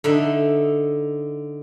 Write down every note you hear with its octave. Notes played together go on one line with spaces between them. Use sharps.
D3 D#4 E5